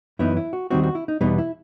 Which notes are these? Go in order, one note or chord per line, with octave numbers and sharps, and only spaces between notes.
F#2 E3 B3 D#4 E4
E4
F#4
D#2 D#3 G3 C4 D#4 F#4
F#4
E4
D#4
E2 B2 G3 B3 D#4
E4